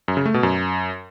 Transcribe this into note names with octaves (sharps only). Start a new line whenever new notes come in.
F#2
C#3
A3
B2
F#2